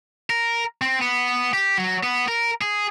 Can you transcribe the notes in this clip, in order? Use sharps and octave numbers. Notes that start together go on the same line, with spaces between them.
A#4
C4
B3
G4
F#3
B3
A#4
G#4